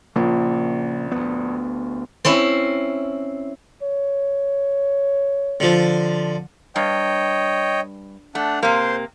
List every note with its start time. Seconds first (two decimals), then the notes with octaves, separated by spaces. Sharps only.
0.16 A#1 C#3 A#3
1.12 D2 B3
2.25 C4 C#4 E4
3.83 C#5
5.60 D3 F3
6.76 G2 C#5 D#5 G5
8.35 A3 D4 F#5
8.63 C3 A#3 C5 C6